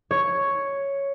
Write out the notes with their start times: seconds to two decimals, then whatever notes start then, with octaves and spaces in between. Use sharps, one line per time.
0.11 C#5